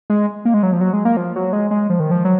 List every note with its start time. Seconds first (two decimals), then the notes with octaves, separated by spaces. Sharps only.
0.10 G#3
0.45 A#3
0.54 G#3
0.63 F#3
0.73 F3
0.81 F#3
0.93 G#3
1.05 A#3
1.17 F3
1.36 F#3
1.53 G#3
1.71 G#3
1.90 F3
2.00 D#3
2.11 F3
2.25 F#3